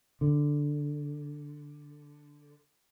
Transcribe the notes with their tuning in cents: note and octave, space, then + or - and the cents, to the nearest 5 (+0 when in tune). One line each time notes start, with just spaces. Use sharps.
D3 +0